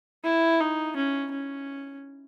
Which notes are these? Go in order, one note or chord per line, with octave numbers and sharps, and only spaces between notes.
E4
D#4
C#4
C#4